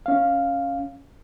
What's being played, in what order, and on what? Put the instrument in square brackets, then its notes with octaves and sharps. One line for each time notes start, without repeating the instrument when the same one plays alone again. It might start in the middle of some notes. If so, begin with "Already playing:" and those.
[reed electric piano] C#4 F5